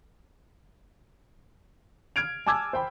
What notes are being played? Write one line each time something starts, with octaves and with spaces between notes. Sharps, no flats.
F6 G#6 D7 F7
G#5 A5 D6 E6 G#6
C5 G5 B5